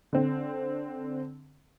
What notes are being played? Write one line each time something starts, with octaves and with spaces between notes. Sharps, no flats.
D3 C4